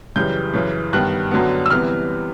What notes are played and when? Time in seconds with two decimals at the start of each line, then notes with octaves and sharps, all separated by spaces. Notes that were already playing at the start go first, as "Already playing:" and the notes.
0.16 F#2 C#3 E3 G3 G6
0.54 F#2 C#3 E3
0.93 G2 D#3 G3 B3 F#6
1.31 F#2 D3 F#3 B3
1.66 E6
1.70 C3 E3 G3 B3 F6